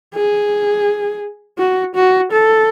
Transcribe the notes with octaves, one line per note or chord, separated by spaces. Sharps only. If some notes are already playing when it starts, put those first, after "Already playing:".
G#4
F#4
F#4
A4